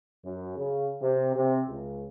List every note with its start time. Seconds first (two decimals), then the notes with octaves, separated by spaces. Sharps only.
0.23 F#2
0.57 C#3
1.00 C3
1.35 C3
1.68 C#2